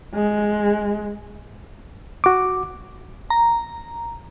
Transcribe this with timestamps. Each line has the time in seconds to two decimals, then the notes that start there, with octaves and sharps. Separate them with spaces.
0.15 G#3
2.24 F#4 D6
3.30 A#5